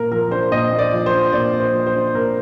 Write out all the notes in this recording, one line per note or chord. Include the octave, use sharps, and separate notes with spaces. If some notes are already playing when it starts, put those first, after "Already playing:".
Already playing: A#2 A#3 A#4
F3 A#4
D4 C5
A#2 D#5
A#3
D5
F3
C5
D4
A#2 D5
A#3
C5
F3
C5
D4
A#2 A#4